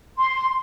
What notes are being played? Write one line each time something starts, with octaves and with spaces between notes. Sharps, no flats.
C6